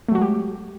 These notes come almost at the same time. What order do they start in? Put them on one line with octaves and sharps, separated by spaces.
A3 F#3 F#4 G#3 G4